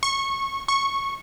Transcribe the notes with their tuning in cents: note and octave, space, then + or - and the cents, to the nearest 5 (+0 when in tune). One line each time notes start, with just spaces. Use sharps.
C#6 -20
C#6 -10